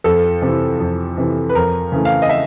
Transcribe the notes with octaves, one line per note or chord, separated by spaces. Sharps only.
F2 A4
C3 E3
F2
C3 E3
B4
F2 A#4
C#3 E3 A3
F5
D#5
E5